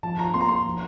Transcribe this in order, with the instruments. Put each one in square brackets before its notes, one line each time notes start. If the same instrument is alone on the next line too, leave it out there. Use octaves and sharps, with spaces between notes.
[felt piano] F3 [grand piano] A5
[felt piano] F3 [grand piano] A#5
[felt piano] A#3 [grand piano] C6
[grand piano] A#5
[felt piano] F4 [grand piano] C6
[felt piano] F3